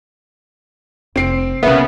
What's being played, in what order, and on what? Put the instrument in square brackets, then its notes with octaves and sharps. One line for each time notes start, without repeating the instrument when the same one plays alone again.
[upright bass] F1 [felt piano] C4 C7 D7
[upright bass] B1 C#4 [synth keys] C#3 B3 [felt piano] A#3 [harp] E5